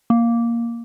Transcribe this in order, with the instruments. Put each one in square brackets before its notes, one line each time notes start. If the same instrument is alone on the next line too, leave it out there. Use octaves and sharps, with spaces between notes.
[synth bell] A#3